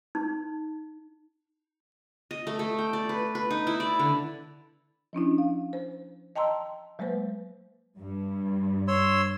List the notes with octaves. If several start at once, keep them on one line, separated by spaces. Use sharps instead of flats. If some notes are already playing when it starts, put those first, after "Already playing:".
D#4
D#5
A3
A3
G5
D5
B4
B4
D#4
E4
D5
D3
F3 C#4 D4 E4
F5
C5
D#5 G5 A5 A#5 C6 E6
F#3 G#3 A#3 B4 C5
G2
C#5 C6 E6